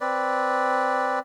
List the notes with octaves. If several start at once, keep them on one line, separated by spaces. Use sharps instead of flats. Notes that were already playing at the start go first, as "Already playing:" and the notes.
C4 B4 D5